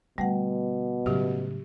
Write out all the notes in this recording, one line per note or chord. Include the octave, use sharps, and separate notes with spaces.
B2 D3 G3 A3 F#5
A2 C#3 F#3 G4